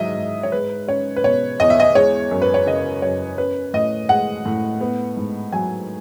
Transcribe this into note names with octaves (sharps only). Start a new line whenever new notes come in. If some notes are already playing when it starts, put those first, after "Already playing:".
Already playing: G#2 F#3 D#5 E5
G#2
C#5
G#3 B4
C#4 C#5
B4
B2 C#5
E2 D#5
E5
D#5
G#3 C#5
F#2
B4
C#5
C#3 D#5
F#2 C#5
C#4 B4
A2 D#5
G#3 F#5
A2
B3
G#2
F#3 G#5